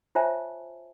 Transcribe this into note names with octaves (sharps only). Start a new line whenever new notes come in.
F4 C5 C#5 E5 G#5 A5